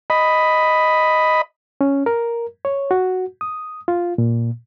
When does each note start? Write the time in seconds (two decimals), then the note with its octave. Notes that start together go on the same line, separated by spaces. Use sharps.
0.10 D#5 B5
1.81 C#4
2.06 A#4
2.65 C#5
2.91 F#4
3.41 D#6
3.88 F4
4.18 A#2